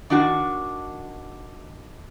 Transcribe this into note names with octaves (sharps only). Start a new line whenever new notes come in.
D#3 D4 F#4